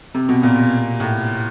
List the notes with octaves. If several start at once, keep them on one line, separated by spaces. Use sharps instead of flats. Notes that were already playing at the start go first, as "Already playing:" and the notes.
C3
B2
A#2
A2